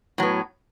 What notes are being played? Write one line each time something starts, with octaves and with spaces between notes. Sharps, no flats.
A2 F#3 B3